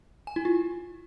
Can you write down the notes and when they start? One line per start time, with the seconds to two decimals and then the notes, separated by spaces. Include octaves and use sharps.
0.27 G#5
0.36 E4
0.45 F4